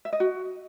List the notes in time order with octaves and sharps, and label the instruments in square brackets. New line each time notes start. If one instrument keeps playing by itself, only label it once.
[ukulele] E5
D#5
F#4